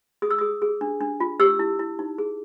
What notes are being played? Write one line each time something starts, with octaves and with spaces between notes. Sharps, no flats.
G#4 D#6
E6
G#4 D#6
G#4
D4
D4
F4
G4 E6
E4
E4
D#4
G#4